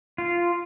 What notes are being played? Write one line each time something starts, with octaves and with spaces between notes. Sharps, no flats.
F4